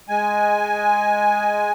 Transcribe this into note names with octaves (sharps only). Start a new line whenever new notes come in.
G#3 G#5